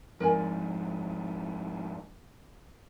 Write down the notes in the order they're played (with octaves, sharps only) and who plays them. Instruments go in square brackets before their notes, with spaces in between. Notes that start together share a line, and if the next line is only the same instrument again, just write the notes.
[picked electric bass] F2 G#2 [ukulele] A#4 D5 G#5